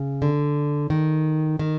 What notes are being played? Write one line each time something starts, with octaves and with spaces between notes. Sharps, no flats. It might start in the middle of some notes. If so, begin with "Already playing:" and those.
Already playing: C#3
D3
D#3
D#3